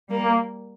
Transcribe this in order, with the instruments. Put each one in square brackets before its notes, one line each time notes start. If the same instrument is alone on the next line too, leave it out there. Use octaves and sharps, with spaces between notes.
[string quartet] G3 A#3
[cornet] A#3